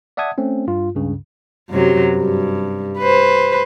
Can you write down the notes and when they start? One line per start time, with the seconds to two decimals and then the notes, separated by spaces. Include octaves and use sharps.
0.17 D5 E5 F#5 A5 D#6 G#6
0.38 A3 C4 C#4
0.67 G2 F4
0.95 C#2 G2 C#3
1.70 F#2 C3 F#3
2.18 G2
2.99 B4 C5